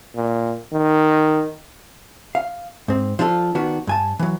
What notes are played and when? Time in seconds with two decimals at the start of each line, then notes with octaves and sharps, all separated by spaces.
0.16 A#2
0.73 D#3
2.35 F5
2.88 G#2 C4
3.19 F3 D4 F4 G#4 A4
3.55 D#3 B3 D4 F#4
3.87 G2 G#5 A5
4.19 E3 F#3